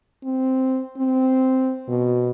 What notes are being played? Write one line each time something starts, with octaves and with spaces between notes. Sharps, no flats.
C4
C4
B2